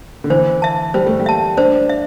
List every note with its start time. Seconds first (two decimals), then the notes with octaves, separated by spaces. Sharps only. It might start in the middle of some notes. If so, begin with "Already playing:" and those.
0.24 D3
0.30 E3 C5
0.62 E5 A5
0.94 G3 C5
1.06 A3
1.19 G3
1.26 E5 A5
1.57 D4 C5
1.89 E5